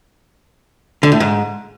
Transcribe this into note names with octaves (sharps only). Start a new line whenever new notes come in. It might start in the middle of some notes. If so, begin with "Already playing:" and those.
D3
A2
G#2